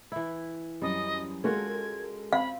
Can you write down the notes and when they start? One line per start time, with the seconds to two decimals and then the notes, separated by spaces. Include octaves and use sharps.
0.12 E3 E4
0.82 F#2 G3 D#5 D#6
1.44 G#3 C#4 F4 F#4 A4 A#4 G#6
2.33 C4 F5 B5